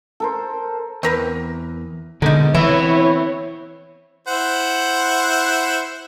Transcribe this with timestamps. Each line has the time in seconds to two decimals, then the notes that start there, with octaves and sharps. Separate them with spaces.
0.20 A4 A#4 C5
1.03 E2 C4 A#4 B4
2.22 B2 D3 G#3 B3 D#4 A#4
2.55 E3 B3 C4 E4 B4 C#5 E5
4.27 E4 C5 F#5